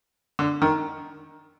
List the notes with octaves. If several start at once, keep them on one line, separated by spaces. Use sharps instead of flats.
D3
D#3